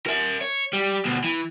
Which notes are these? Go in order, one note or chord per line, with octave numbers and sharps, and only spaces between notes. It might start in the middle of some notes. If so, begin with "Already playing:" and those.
A#4 E5
C#5
G3
D2 B2
E3